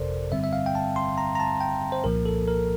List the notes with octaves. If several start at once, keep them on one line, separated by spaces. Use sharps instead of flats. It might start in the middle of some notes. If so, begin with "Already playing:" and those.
Already playing: G1 F2 C3 A4 A#4 C5 D5
G2 D3 G3 C4 E5
E5
F5
G5
A5
C6
A#5
A#5
A5
G5
C5
C2 A#2 F3 A#3 A#4
A4
A#4